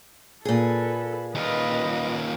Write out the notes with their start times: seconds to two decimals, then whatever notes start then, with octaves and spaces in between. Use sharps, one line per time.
0.45 A#2 G#4 A4 B4
1.35 D#2 F4 B4 D#5